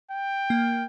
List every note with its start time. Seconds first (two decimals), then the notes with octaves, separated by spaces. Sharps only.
0.11 G5
0.50 A#3